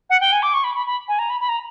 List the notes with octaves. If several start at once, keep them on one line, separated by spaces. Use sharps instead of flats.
F#5
G5
G#5
D6
C#6
B5
B5
B5
G#5
A#5
B5
B5
A#5